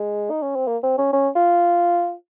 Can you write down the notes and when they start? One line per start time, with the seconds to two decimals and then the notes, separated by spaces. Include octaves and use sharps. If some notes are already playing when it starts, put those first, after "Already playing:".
Already playing: G#3
0.30 D#4
0.42 C#4
0.56 C4
0.67 A#3
0.83 C4
0.98 C#4
1.13 C#4
1.35 F4